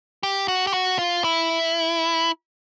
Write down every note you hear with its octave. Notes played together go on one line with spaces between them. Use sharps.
G4
F#4
G4
F#4
F4
E4